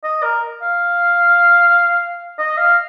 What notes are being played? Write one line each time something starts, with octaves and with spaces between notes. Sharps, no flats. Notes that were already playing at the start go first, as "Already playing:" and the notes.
D#5
A#4
F5
D#5
F5